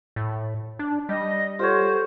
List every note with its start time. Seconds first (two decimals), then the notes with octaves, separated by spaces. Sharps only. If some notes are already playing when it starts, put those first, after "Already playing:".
0.16 A2
0.79 D4
1.09 G3 D#5
1.59 F4 G4 A4 C5 C#5 F#5